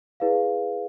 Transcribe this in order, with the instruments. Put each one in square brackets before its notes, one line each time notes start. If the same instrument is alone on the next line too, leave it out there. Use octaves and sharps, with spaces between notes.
[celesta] E4 G#4 B4 D5 F5